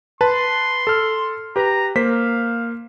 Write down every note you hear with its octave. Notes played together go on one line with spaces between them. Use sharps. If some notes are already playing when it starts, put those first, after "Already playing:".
B4 A5 C6
A4 F6
G4 B4 A#5
A#3 C5 F5 B6